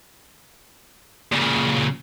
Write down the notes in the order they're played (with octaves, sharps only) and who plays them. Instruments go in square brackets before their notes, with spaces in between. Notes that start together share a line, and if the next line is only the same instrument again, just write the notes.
[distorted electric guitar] A#2 C#3